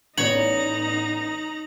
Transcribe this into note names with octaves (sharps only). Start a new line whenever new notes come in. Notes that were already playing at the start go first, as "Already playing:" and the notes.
A1 B3 D#4 C#5 D5 A#5 F#7